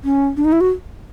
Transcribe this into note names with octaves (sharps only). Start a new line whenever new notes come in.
C#4
D4
D#4
E4
F#4